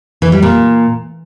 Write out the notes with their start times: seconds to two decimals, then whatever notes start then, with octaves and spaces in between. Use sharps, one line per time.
0.22 E3
0.32 G3
0.42 A#2